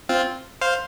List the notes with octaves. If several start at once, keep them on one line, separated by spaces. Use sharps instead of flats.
C4 F4
C5 F5